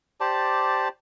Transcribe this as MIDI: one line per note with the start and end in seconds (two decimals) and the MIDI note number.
0.20 0.88 67
0.20 0.88 72
0.20 0.88 74
0.20 0.88 81